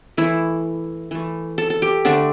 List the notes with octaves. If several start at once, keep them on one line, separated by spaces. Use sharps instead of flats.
E3 A3 E4
E3 A3
A4
A4
G4
D3 A3 D4